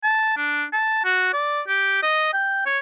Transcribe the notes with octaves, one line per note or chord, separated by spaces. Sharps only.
A5
D4
A5
F#4
D5
G4
D#5
G5
C#5